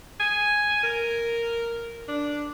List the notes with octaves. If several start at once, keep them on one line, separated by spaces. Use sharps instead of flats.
G#5
A#4
D4